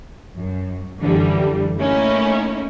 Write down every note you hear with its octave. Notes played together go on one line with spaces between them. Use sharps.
F#2
F#2 D3 E3 G3
A3 A#3 C#4 D#4 E4